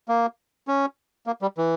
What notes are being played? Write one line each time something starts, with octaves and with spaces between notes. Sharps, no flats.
A#3
C#4
A#3
G3
E3